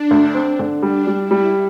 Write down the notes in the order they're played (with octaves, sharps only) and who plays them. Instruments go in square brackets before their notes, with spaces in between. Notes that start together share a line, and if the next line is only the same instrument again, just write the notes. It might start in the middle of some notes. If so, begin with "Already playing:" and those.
Already playing: [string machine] D4
[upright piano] D2
C4
D3
[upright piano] G3 [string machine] D4
[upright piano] G3
[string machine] E4
[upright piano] G3